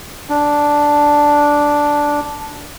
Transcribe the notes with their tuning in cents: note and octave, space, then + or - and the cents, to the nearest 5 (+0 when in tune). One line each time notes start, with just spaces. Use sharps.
D4 -5